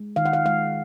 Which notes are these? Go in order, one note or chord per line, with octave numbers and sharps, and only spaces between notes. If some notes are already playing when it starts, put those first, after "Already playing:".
Already playing: G#3
D#3 F5
F#5
F5
G#3 F5